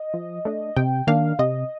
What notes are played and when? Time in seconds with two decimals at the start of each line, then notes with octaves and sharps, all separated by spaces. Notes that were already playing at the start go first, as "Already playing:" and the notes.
Already playing: D#5
0.14 F3
0.45 A3 D4
0.76 C3 G5
1.07 D#3 A#3 D4 F5
1.39 C3 D#5